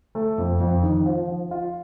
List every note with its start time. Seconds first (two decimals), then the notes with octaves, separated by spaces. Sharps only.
0.15 A3
0.38 F2
0.60 F2
0.83 D#3
1.06 F3
1.28 F3
1.51 F4